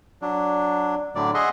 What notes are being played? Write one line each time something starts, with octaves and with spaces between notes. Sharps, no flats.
F#3 D4
A2 D3 F#3 D5
G#4 D#5 E5 F#5 C6